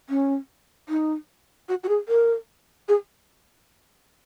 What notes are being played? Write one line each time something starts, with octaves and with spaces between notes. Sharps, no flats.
C#4
D#4
F#4
F#4
G#4
A#4
G#4